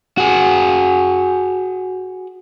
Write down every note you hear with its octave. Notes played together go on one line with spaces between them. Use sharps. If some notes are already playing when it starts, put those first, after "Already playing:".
F#4 G#4